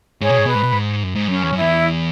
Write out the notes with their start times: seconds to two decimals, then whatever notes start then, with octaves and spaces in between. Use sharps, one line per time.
0.21 G#2 G#4 C#5
0.30 B2
0.38 G#2
0.46 B2 B4
0.55 G#2
0.63 B2
0.72 G#2
1.03 F#2
1.15 G#2
1.28 F#2 C#4
1.43 E2
1.53 F#2
1.57 E2 E4